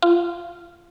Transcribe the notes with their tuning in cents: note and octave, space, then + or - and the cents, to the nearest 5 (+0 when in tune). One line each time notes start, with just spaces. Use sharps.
F4 -20